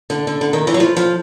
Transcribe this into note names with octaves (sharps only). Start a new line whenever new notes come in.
D3
D3
D3
D#3
E3
F#3
F3
F3